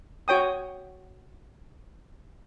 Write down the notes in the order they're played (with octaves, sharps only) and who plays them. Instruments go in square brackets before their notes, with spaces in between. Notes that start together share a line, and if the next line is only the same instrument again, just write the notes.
[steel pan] F#4 C#5 G5 D#6